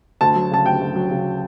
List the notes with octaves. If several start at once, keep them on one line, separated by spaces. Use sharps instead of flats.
D2 A5
F#3
C#3 A5
D2 G5
D2
F#3
C#3